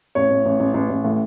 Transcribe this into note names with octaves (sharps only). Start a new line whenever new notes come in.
A1 C#5
A1
A1
A1
A1
A1
A2